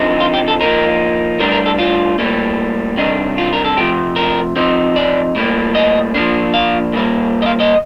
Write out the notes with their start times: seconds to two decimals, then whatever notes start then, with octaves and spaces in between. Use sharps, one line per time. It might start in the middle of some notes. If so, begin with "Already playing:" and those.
Already playing: D3 F3 C4 D#4
0.20 F4
0.34 G4
0.48 A4
0.61 F3 A#3 D#4 A#4
1.40 A2 G3 D4 A#4
1.52 A#4
1.66 A4
1.78 F4
2.19 A2 G3 A#3
2.97 C3 D#3 G3 D4 D#4
3.38 F4
3.53 A#4
3.65 A4
3.77 C3 F3 A3 G4
4.16 A#4
4.56 F3 C4 D#4
4.96 D5
5.35 A2 G3 A#3
5.75 D#5
6.14 F3 A#3 D4
6.54 F5
6.93 A#2 G3 A#3
7.42 D#5
7.46 F5
7.60 D#5